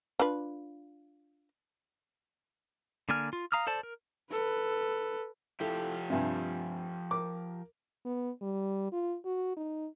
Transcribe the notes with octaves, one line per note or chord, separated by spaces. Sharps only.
D4 F4 B4
D3 A#3 D5 G#5 F6
F4
F5 A#5 D#6 F6
A4 C5 D5 A5
A#4
A4 B4
F3 E4 G4 A4
G2 C3 F4 E5 G#5
A#4 D6
B3
G3
F4
F#4
D#4